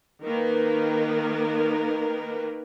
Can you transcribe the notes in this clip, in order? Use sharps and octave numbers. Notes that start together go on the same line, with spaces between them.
D#3 A#3 A#4 B4